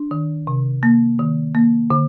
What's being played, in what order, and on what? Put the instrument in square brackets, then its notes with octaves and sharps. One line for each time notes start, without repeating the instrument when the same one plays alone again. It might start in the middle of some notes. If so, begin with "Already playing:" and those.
Already playing: [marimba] D4
D#3
C3
A#3
D#3
A#3
D3